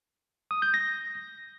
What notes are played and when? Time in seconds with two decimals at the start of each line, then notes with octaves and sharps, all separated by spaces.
0.51 D#6
0.62 G6
0.74 A#6